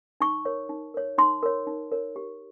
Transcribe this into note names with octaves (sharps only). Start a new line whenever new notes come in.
D#4 C#6
A#4 C#5
D#4
A#4 C#5
D#4 C6
A#4 C#5
D#4
A#4 C#5
G4